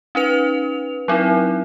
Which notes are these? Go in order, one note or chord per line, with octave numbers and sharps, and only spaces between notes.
C#4 D#4 B4 F7
F#3 C4 D#4 E4